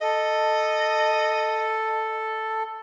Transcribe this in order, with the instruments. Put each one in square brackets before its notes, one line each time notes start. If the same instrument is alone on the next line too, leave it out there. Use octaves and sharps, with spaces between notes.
[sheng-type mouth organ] A4 [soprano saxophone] D#5